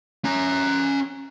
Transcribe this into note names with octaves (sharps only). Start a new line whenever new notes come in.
C#4 A#5